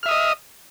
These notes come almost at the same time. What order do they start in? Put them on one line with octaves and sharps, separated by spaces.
F6 E5 D#6 D#5